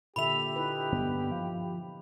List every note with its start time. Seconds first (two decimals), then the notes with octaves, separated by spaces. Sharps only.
0.16 A#2 D3 G4 E5 B5 F7
0.56 D#4 E4 B4
0.92 G2 D3 B3
1.31 F3